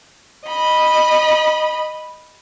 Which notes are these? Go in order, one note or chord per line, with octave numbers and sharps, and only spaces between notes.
D#5 B5